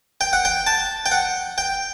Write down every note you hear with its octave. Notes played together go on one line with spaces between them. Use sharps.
G5
F#5
G5
A5
G5
F#5
G5